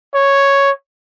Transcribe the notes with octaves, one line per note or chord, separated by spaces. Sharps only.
C#5